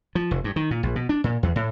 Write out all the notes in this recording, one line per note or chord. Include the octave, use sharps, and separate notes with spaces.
F3
F1
G2
D#3
A#2
A#1
B2
D4
A#2
E2
A2